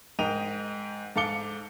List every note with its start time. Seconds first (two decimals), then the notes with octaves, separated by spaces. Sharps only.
0.19 G#2 A#4 D#5 G5 D#7 F7
1.16 G#2 A4 F5 D6 C#7 G7